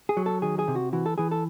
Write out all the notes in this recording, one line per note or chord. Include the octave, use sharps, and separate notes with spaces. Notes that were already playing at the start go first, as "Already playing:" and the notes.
G#4
F#3
A4
D#3 G#4
G#4
C3
F#4
E3 F#4
A4
E3 G#4
A4